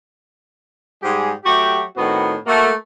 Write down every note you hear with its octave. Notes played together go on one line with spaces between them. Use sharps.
G#2 G3 G#3 G4 G#4
F#3 A3 F#4 G4
A2 D#3 B3 C4 F#4
A3 A#3 F#4